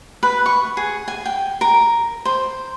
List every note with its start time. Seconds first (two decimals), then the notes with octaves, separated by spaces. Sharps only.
0.23 B4
0.46 C#6
0.77 G#4
1.08 G#5
1.26 G5
1.61 A#4
2.25 C5